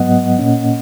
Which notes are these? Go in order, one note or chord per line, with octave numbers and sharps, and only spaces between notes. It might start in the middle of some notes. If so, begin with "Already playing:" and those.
Already playing: G#2 F#3 B3 D#5 F#5
A#2 A#3 C#4